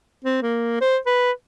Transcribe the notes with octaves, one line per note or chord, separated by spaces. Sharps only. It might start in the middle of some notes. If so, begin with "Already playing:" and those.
C4
A#3
C5
B4